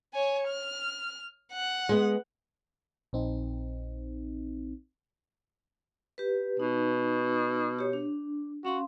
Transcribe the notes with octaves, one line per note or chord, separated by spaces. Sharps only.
C#5 G#5
F6
F#5
G#3 B3
A#1 C4 D#4
G4 B4
B2 D#4
G4 C#5
D4
C#4 F#4 F5 C6